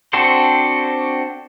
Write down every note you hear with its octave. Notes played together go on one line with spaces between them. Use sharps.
C4 D4 F#4 A4 C5